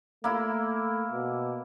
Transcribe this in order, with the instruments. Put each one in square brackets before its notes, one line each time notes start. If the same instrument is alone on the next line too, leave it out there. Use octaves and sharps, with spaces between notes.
[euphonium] A3 [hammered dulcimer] A#3 E4
[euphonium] B2